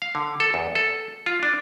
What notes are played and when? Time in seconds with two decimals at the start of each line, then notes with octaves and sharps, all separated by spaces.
0.02 F5
0.15 D3
0.40 A4
0.54 E2
0.75 A4
1.26 F4
1.43 D4